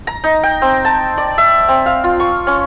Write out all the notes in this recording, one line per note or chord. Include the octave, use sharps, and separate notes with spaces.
A#5
D#4
G5
C4
A5
D5
E5
C4
F5
F4
C#6
C#4